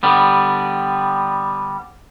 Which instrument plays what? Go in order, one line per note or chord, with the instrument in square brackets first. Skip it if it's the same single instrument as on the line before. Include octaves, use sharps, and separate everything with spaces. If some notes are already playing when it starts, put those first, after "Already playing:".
[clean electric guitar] D3 G3 B3